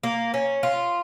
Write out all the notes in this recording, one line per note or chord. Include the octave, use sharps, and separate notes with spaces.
A#3
C#4
F4